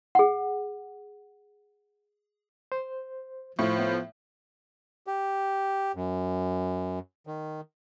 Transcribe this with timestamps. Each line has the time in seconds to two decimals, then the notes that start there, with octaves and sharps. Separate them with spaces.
0.15 G#4 F#5
2.72 C5
3.59 A2 F3 E4 C#6
3.79 B3
5.07 G4
5.95 F#2
7.27 D#3